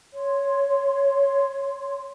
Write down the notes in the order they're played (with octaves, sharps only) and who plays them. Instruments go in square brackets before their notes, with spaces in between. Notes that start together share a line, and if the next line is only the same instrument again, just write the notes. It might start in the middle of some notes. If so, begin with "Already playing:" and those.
[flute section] C#5 C6